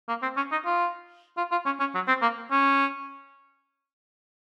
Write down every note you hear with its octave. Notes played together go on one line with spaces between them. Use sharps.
A#3
C4
C#4
D#4
F4
F4
F4
C#4
C#4
F#3
C4
A#3
C#4